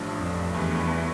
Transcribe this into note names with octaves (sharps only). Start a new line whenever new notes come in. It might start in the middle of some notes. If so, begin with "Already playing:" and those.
Already playing: A1 G2 F3 A3 D4
F2
E2 G2 E3 A3